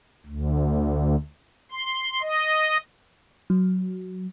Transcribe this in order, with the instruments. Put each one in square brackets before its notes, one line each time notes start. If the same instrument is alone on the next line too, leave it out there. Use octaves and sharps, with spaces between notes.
[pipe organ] D2
C6
D#5
[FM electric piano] F#3